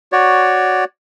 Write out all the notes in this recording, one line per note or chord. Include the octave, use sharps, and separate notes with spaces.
F#4 C#5 D5